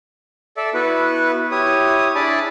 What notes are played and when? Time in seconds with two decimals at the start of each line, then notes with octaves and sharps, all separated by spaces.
0.57 A4 D5 E5
0.74 B3 E4 F#4 B4
1.51 E4 G4 C#5 D#6
2.15 D4 E4 G#4 D5 A5 B5